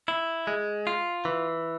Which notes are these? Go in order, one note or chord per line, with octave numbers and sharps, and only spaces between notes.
E4
G#3
F4
E3